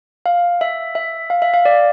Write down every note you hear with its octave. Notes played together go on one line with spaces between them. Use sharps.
F5
E5
E5
F5
E5
F5
D5